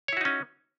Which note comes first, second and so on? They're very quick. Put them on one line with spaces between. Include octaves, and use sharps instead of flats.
C#5 E4 F#4 D#4 C#4